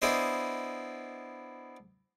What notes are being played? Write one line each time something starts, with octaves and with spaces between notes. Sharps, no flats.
B3 D4 E4 G#4 C5 D#5